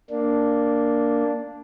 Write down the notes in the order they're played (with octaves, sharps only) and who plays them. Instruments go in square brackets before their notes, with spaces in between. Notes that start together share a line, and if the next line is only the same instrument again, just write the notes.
[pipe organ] A#3 D4